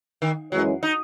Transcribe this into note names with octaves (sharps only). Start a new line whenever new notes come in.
D#3
F#2 E3 F#3 G#3 C#4 E4
D#4